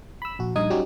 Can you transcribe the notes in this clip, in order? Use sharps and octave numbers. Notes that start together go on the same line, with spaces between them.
B5 E6
A#1 F#4
A#1 G2 D#4 D#5 D#6 G#6
F#3 G3 C#4 D#4 F#4 G4